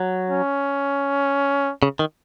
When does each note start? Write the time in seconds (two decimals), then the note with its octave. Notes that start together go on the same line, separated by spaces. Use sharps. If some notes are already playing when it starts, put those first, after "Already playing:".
Already playing: F#3
0.30 C#4
1.83 C#3
1.99 D#3